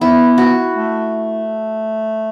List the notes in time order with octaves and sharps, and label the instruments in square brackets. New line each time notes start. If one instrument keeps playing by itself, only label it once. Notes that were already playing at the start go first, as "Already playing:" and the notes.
[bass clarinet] B3 [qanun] E4
[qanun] F#4
[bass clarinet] A3